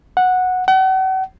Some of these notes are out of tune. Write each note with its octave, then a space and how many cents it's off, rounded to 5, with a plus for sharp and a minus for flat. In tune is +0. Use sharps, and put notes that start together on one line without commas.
F#5 -10
F#5 +40